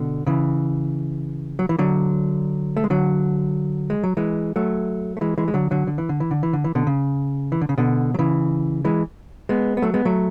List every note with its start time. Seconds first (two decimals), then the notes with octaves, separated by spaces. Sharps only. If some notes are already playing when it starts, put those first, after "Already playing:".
Already playing: B2 D3
0.27 C#3 E3
1.59 F#3
1.69 E3
1.79 D3 F#3
2.77 A3
2.84 G#3
2.90 D3 F#3
3.90 G#3
4.04 F#3
4.17 E3 G#3
4.56 F#3 A3
5.17 A3
5.21 E3 G#3
5.38 E3 G#3
5.48 G#3
5.54 D3 F#3
5.71 D3 F#3
5.87 D3
5.98 E3
6.09 D3
6.20 E3
6.31 D3
6.43 E3
6.53 D3
6.64 E3
6.75 B2 D3
6.87 C#3
7.52 E3
7.61 D3
7.69 C#3
7.78 B2 D3
8.14 F#3
8.19 C#3 E3
8.85 E3 G#3
9.49 G#3 B3
9.77 B3
9.82 F#3 A3
9.94 G#3 B3
10.05 F#3 A3